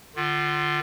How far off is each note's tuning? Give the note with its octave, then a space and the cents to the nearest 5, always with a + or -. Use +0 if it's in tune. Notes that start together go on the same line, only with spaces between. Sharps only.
D3 +35 F4 +0